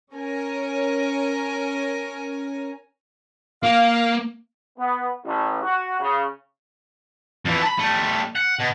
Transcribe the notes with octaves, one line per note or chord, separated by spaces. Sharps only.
C#4 A#4 C#5 G#5
A#3 F5
B3
A1
F#4
C#3
F2 E3
A5 B5
G3 A3
F#5
B2